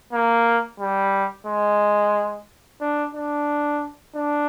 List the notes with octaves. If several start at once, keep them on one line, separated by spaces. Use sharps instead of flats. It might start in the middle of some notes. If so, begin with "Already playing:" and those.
A#3
G3
G#3
D4
D4
D4